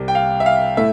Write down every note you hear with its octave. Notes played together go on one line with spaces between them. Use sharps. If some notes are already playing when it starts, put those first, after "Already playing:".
Already playing: C2 C3 G3
G5
F5
E5
F5
A2 A3 E4 E5